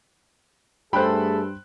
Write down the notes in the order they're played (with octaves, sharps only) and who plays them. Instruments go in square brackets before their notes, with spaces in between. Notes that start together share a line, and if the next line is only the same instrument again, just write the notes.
[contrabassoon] G2 [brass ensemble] A3 G#4 A4 [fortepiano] C5 G5 [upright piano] B5 F#6